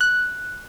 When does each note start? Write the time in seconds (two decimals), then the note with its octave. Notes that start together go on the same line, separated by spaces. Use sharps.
0.01 F#6